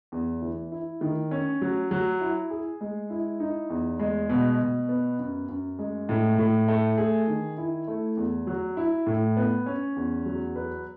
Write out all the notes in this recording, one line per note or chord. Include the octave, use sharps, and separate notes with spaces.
E2
E3
E4
D#3
C#4
F#3
F#3
E4
G#4
G#3
E4
D#4
E2
G#3
B2
B2
B3
F#2
F#2
G#3
A2
A2
A3
G#4
D#3
E4
A3
E2
F#3
E4
A2
B3
C#4
E2
F#3
B4